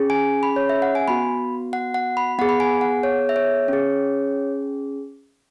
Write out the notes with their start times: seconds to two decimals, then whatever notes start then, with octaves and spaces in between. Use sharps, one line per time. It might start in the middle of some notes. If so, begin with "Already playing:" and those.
Already playing: C#4 G#4
0.10 G#5
0.43 B5
0.56 C#5
0.69 E5
0.82 F#5
0.95 G#5
1.08 B3 F#4 B5
1.73 F#5
1.94 F#5
2.17 B5
2.39 B3 G#4 F#5
2.49 B5
2.60 G#5
2.81 F#5
3.03 C#5
3.29 E5
3.36 C#5
3.68 C#4 G#4